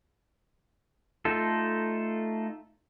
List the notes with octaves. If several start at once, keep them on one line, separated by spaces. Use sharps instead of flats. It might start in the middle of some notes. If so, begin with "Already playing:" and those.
A3 D#4 F4 A4